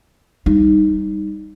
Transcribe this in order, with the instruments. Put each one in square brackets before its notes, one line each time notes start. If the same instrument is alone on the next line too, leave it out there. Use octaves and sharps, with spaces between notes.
[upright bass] G3 D#4